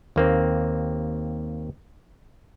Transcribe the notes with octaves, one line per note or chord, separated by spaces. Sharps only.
D#2 A#3 C4